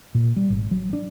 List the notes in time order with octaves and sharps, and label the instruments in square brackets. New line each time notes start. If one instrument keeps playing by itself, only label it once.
[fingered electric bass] A#2
G3
G#1
F#3
D4